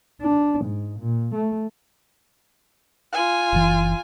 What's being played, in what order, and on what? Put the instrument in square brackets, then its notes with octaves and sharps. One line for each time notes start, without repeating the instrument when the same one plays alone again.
[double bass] D4
G#2
A#2
A3
[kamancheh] F4 G#5
[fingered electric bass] F#1 C#3 E3